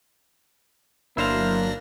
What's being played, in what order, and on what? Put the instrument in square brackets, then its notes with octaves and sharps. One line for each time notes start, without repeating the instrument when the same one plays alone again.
[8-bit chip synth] G1 D4 A#6 [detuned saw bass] F#3 [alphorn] A#3 [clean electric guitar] E4 C5 F5